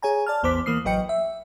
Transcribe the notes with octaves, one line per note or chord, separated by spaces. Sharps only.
G#4 C#5 G#5 A#5
D5 A5 F6
A1 E2 B3 C5 D6 B6
E3 A#3 D#6 C7
A1 F#3 B4 D#5 G5 C#7
E5